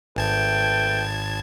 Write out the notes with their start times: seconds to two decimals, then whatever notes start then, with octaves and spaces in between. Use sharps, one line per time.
0.16 G#1 A3 B4 G5 A5 G#6